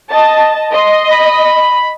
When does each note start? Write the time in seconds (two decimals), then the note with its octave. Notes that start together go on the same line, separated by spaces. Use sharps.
0.10 D#5 A5
0.73 D#5 C6
1.09 B5